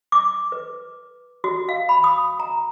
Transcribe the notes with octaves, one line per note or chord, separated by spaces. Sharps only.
D6
B4
F#4
F5
B5
D#6
A#5